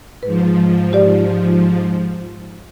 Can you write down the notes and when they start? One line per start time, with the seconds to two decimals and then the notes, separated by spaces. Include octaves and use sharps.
0.23 G#2 F3 B4
0.93 G4 D5